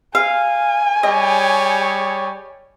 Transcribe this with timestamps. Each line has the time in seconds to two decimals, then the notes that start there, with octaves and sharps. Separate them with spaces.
0.15 F5 G#5
1.03 G3 G#4 C#5 D#5